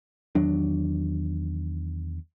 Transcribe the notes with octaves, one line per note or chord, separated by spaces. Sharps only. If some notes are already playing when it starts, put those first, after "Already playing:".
E2 D#3 F#3 D4